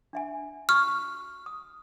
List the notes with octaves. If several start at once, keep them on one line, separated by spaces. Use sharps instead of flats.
D4 E5 G#5
F#4 C#6 F6
D#6